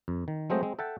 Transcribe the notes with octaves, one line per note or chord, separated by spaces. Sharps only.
F2
D#3
F#3 G#3 A3 C4 C5 D#5
G#3 C4
A4 E5 F#5 G5 A5